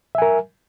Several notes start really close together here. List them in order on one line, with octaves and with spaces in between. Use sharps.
E5 G#5 A#4